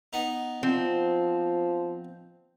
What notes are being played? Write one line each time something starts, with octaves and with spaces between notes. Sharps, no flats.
B3 D#4
F3 C4